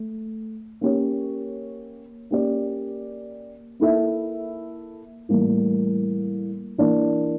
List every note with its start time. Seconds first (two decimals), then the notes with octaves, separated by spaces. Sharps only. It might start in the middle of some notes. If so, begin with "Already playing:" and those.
Already playing: A3
0.81 A#3 C#4 G4 C#5
2.31 A#3 C#4 G4 D5
3.80 A#3 E4 A4 E5
5.29 A2 E3 G3 A#3
6.78 E3 A#3 D4